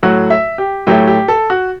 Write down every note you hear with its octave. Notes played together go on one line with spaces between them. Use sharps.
A2 F#3 A3 F#4
E5
G4
A2 F#3 A3 G4
G4
A4
F#4